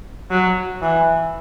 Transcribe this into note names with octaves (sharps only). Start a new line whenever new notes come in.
F#3
E3